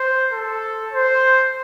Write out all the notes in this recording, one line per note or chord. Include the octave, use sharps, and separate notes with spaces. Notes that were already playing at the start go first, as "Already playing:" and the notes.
Already playing: C5
A4
C5